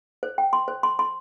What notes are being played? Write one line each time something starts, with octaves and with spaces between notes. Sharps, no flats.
C5
G5
C6
C5
C6
C6